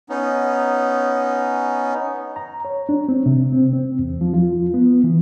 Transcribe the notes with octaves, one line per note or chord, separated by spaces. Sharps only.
B3 C#4 D#4
A#5
C#5
D4
C4
C3
C4
C4
E2
F3
F4
B3
E3